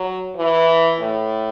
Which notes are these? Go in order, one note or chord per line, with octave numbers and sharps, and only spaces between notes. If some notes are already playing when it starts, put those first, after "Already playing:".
Already playing: F#3
E3
A2